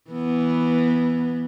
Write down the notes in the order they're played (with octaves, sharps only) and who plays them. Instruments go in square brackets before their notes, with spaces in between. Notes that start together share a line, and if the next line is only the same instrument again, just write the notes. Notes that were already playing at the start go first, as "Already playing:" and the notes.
[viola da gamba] E3 B3